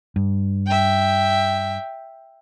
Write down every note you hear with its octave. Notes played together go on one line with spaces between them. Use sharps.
G2
E5 G5